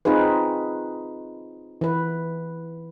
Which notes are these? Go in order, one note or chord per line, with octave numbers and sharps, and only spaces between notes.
C4 D#4 F4 G#4 B4
E3 B4